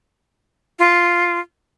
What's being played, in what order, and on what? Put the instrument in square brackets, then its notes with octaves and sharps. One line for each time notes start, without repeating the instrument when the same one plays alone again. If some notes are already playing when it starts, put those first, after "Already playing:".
[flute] F4